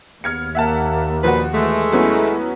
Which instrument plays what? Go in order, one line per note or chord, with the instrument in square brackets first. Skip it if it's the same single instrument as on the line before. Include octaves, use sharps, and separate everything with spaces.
[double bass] D#2 [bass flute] B3 [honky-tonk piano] F6 G#6 C#7
[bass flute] A#3 [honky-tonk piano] E5 F#5 A5
[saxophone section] A#2 B4 [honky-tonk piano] F3 F#4
[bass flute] E3 [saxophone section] G#3 A3
[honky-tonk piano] F#3 B3 C#4 [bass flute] E4